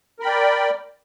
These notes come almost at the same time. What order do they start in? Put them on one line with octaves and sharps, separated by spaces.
A#4 B5 G5 D5